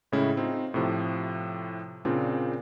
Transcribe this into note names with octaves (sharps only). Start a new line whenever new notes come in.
A2 C#3 G#3 C#4 E4
C4 D#4 F4
A2 C3 F3
A#2 C#3 C4 D4 F4